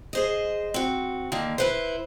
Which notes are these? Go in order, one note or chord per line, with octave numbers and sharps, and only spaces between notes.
G#4 C5 D#5
C4 F#4
D3 D#3 A#3
E4 B4 C5